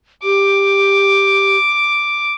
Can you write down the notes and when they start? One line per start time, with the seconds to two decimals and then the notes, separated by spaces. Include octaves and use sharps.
0.23 G4 D6